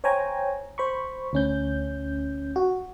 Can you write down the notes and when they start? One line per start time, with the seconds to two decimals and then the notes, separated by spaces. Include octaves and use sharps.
0.04 C5 C#5 G5 G#5 A#5
0.78 C5 B5 C#6
1.33 D2 C#4 G6
2.56 F#4